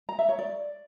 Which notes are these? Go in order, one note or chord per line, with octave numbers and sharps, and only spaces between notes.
A#5
E5
C#5
D5